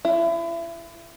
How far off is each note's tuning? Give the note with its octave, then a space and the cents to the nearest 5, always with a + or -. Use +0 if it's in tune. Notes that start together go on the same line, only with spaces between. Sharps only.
E4 +30